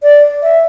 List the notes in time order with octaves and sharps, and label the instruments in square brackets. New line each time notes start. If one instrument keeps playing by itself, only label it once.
[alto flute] D5
E5